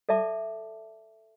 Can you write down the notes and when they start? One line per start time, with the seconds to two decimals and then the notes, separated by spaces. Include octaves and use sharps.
0.09 A4 D5 E5 A5 D6